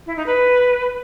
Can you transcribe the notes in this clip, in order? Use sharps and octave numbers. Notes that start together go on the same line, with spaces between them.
E4
D#4
B4